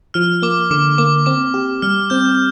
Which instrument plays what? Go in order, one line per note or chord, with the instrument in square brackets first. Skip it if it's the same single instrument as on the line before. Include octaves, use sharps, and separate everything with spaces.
[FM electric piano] F3 [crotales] F6
[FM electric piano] A#3 [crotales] D6
[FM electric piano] D3 [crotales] D6
[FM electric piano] A#3 [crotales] D6
[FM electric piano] C4 [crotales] D6
[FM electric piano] G4
[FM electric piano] G3 [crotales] F6
[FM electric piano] C4 [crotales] G6